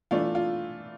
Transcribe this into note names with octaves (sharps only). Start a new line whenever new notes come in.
E3 A3 D4 F4
F4